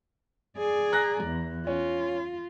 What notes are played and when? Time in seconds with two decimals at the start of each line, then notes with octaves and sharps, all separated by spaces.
0.57 G#4 D5
0.92 A#5 F#6 A#6
1.24 E2
1.67 C#4 F4